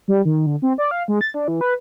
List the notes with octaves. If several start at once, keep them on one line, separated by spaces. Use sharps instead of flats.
G3
D#3
D3
C4
D5
F5
G#3
A6
D4
E3
B4